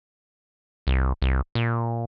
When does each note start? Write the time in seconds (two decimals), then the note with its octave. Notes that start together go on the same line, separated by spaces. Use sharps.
0.87 C2
1.22 C2
1.55 A#2